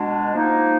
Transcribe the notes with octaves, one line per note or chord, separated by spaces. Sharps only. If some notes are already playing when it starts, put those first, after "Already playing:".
Already playing: B2 G#3 D4
F3 A#3 D#4